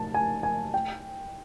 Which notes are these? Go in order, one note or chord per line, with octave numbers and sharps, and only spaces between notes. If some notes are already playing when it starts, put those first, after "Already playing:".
Already playing: A5
G#5
G#5
G5